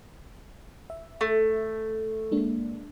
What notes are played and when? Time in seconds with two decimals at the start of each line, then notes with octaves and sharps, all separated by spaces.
0.90 E5
1.21 A3
2.32 G#3 A#3 D4